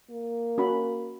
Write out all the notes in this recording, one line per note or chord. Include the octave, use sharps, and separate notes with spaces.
A#3
C#4 F#4 B5